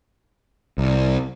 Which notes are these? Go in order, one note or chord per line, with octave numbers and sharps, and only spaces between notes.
C2